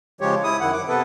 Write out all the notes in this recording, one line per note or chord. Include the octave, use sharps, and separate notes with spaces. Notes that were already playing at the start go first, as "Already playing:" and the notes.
C#3 F3 G#3 G4 C#5
E4 D#6
F#2 D#3 E4 F#5
D6
C3 B3 A4 B4